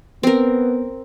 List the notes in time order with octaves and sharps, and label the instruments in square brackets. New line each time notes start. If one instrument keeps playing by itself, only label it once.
[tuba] B3 [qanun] C4 A#4